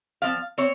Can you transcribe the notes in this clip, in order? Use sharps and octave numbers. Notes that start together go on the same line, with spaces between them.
F3 C4 F5
C4 C#5